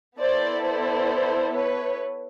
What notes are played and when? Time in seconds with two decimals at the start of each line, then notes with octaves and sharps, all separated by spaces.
0.18 B3 E4 A4 C5 D5
0.63 C5 D5
1.55 B4 C#5